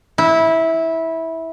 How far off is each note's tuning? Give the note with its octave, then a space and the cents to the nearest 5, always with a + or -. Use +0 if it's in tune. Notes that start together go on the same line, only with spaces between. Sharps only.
E4 -15